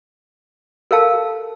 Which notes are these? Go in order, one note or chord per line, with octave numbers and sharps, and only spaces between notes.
A4 A#4 F5 A5